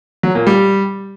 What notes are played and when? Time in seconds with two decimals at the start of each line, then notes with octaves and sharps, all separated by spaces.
0.23 F#3
0.35 A#2
0.47 G3